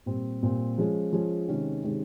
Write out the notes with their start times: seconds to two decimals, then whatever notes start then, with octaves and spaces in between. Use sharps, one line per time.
0.06 A#2 G3 C4
0.43 A#2 G3 C4
0.78 F3 G#3 C#4 F4 G#4
1.13 F3 G#3 C#4 F4 G#4
1.48 C3 D#3 G#3 C#4
1.83 C3 D#3 G#3 C#4